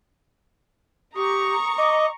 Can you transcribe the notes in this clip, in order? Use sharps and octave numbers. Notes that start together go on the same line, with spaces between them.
G4 A#5 C#6 D#6
D#5 D6